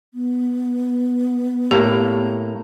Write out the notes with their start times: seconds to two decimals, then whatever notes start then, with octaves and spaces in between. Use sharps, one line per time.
0.14 B3
1.71 A2 A#3 G4